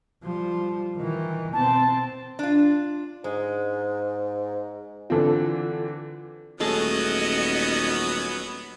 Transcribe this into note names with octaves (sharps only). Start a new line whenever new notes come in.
F3 G3
D#3 E3
B2 C4 A5
D4 F4
G#2 G#3
D3 E3 C4 F4 A4
D#1 F#3 A3 B3 C#4 G#4 D#5 A5